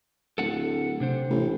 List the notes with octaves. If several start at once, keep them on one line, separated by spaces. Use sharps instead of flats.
D1 A4 F#5
C3 D4 C5
A1